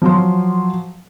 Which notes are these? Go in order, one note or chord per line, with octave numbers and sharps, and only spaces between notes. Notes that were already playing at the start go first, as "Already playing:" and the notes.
F3 F#3 C6